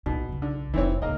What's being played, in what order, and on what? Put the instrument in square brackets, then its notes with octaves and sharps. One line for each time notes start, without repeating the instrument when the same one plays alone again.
[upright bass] A#1 E4 [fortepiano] B2
[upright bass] B1 C#3
[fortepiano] D3
[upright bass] F1 [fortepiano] E3 C4 C#5
[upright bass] D1 C#2 [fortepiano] A#3 D#5